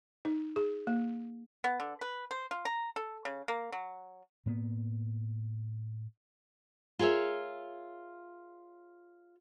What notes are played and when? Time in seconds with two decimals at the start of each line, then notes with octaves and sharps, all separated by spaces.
0.25 D#4
0.56 G#4
0.87 A#3
1.64 B3
1.80 D3
2.01 B4
2.31 C5
2.51 F4
2.65 A#5
2.96 A4
3.25 C#3
3.48 A#3
3.72 F#3
4.46 A2 A#3 B3
6.99 F4 G#4 A#4 C#5 E5